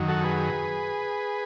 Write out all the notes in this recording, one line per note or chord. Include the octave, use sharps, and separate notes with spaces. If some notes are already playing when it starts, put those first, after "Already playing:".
Already playing: F#2 D#3 F#3
F#4 A4
G#4 B4